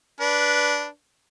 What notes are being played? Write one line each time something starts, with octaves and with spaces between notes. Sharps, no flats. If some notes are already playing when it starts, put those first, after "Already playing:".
D4 B4